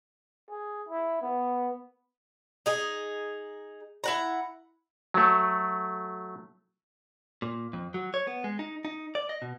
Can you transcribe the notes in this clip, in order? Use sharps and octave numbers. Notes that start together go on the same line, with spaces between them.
G#4
E4
B3
D#4 G#4
E4 F#5 A#5
F#3 A3
A#2
F2
F#3
C#5
B3
G#3
D#4
D#4
D5
D#5
B2